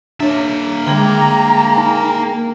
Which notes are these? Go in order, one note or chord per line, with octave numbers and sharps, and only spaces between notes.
A#3 D4 C#5 E5
D3 G#3 D4 G#4 G5 A#5
D#4 G#5